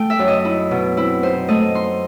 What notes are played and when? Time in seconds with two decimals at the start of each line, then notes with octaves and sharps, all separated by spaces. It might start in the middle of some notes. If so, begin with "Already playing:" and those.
Already playing: A3 G5
0.10 E5
0.19 F#2
0.28 D#5
0.45 D#4 E4
0.71 B2
0.97 C4 E4
1.23 D#4 C5
1.49 A3 D#5
1.75 D#4 C6